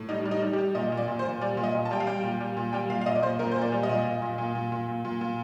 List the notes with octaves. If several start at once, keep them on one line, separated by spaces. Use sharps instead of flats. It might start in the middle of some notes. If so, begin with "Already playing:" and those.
Already playing: A2
G3 D#4
G3
D#4
G3
G4
G3
A#2 D#5
A#2
D5
A#2
C5
A#2
G3 D5
A#2
D#5
A#2
A5
G3 G5
F5
G3 G5
A#2
G3
A#2
G3 G5
A#2 F5
F5
A#2 D#5
D5
A#2 C5
A#2 A#4
A#2 C5
D5
G3
D#5
A#2
A#2
A#2
A#2
A#2
A#2
A#2
A#2
A#2